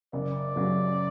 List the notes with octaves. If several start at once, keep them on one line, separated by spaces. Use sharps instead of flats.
F#1 D5
F#2 C#3 F#3